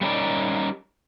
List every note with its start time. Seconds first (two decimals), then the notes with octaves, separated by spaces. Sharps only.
0.01 G3 A3 C#4 D#4 A#4 D5